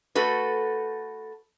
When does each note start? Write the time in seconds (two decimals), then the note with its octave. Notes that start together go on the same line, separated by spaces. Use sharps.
0.15 A3 F#4 A4 B4